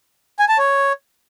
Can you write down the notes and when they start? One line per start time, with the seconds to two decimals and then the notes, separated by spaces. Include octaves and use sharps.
0.39 G#5
0.49 A5
0.58 C#5